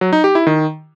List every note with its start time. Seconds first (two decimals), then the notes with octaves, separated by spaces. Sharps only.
0.01 F#3
0.13 D#4
0.24 G4
0.35 E4
0.47 D#3